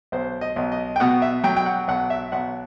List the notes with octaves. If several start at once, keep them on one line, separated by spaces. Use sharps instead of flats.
B1 C5
D#5
B1
D#5
G5
B2 F#5
E5
F#3 G5
G5
F#5
B1 F#5
E5
B1 F#5